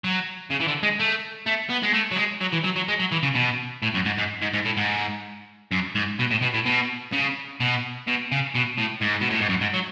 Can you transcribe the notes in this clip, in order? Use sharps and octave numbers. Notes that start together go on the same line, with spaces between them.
F#3
C#3
E3
D3
G#3
A3
A3
B3
G#3
A3
F#3
G#3
F#3
E3
F#3
F#3
G#3
F#3
E3
C#3
B2
A2
F#2
G#2
G#2
G#2
G#2
A2
G#2
F#2
G#2
B2
A2
B2
A2
B2
C#3
B2
B2
C#3
B2
A2
G#2
B2
A2
G#2
F#2
G#2
F#3